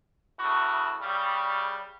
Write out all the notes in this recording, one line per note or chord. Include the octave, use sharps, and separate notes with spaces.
C#3 E3 A3 F#4
C#3 G3